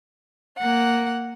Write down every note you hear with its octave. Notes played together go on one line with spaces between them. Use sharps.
A#3 F#5